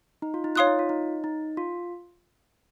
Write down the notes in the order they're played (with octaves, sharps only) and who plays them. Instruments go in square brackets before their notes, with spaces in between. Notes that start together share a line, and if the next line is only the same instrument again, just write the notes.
[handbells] D#4
F4
D#4
[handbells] F4 [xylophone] C#5 F5 C6 D#6 F#6
[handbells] D#4
F4
D#4
D#4
F4